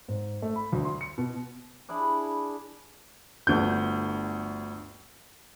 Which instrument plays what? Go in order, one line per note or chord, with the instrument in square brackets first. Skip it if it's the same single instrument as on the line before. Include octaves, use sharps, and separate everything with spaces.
[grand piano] G#2
A3
B5
D2
C6
C#7
B2
[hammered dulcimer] D4 E4 G#4 B5
[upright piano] G1 D2 G6